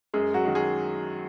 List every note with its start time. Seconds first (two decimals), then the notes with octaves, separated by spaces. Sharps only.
0.14 F#2 G#3 G#4
0.34 F#3 F#4
0.45 D#3 G#3
0.55 G#3 G#4